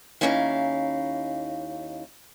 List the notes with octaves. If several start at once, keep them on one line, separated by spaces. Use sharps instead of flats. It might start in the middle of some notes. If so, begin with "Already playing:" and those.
D#2 B2 C#4 D#4 E4 F5